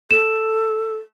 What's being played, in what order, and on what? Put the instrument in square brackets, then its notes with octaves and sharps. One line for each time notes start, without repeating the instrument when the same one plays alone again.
[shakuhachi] A4 [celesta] E7